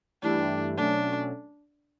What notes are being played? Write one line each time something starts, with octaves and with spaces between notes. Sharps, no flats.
G2 E3 A3 D4 E4 G4
B2 F#3 A3 C#4 D4